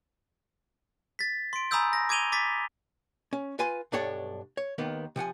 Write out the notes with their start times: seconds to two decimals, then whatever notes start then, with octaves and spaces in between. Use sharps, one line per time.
1.19 A6 B6
1.53 C6 D7
1.71 G#5 A#5 B5 D#6 E6 G6
1.93 A#6
2.09 D6 G#6 D7 D#7 F7 G7
2.32 D6 A6 B6
3.33 C#4
3.59 F4 B4 G#5 C6
3.92 B1 G2 D4 A4 C#5 F#5
4.57 C#5
4.78 D#2 D#3 A#3 B3
5.16 C3 F3 F#5 G#5